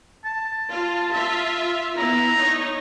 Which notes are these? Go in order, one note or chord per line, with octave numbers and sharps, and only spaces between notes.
A5
F4
F4 E5
B3 E4 A#5
D#4 C#5